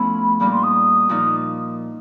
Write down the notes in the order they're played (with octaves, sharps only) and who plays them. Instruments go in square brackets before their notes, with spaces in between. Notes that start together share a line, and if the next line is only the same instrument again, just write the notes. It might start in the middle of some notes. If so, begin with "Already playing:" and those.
Already playing: [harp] F3 A3 B3 C#4 E4 [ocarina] B5
[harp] A#2 G3 A#3 D#4 [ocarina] B5
[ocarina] C6
D#6
[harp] A#2 F3 A#3 D#4